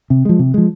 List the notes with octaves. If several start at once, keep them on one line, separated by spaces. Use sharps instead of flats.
C3
F3 G#3
C3
F3 G#3